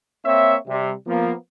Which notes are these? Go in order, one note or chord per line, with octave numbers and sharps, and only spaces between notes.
A#3 C4 C#5 E5
C3 G3
F3 A#3 B3